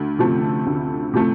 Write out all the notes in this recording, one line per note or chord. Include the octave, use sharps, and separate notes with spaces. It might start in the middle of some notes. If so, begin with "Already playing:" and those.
Already playing: D2
C3 F3 A3
D2
C3 F3 A3